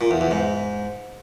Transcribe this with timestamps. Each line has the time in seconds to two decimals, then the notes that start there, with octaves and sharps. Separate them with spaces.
0.01 A#2
0.11 E2
0.21 E2
0.31 G#2